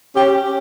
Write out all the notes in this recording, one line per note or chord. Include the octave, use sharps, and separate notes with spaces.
C#4 G4